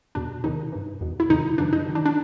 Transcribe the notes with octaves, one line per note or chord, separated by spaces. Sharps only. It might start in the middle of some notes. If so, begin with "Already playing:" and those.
E2 B2 D4
E2 C3 D#3 D#4
G2 E3
E2 B2
E4
F2 C3 D#3 D#4
F#2 C#3 E3 D4
D#4
G2 D#3
D4
D4